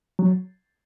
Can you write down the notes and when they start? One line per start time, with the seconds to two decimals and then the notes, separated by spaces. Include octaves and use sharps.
0.19 F#3